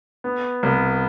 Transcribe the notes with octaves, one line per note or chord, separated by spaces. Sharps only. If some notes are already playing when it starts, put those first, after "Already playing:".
B3
C2